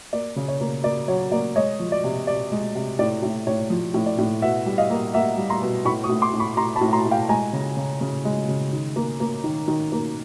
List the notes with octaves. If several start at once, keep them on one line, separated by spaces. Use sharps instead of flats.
A#3 D5
C#3
C#5
A#3
A#3 D5
F#3 C#5
A#3 D5
G#3 C#5 D#5
F3
D5
C3
C3 D5
G#3
C3
A2 D5
A2
A2 C#5
F3
A2
D5
A2
B2 E5 F#5
G3
D#5 F5
A#3
A#3 E5 F#5
G3
A#5 C6
B2
A2 B5 C#6
C#6 D#6
A2
C6 D6
A2
B5 C#6
A2 A#5 C6
A5 B5
A2
A#5 C6
A2
F5 G5
G#3 G#5 A#5
C#3
C#3
C#3
G#3
C#3
D#3
A#3
A#3
D#3
D#3
A#3